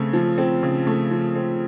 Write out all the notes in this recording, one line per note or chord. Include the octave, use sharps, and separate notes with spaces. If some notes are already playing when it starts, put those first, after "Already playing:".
Already playing: C#3 A3 C4
F3
C4
C#3
A3
F3
C4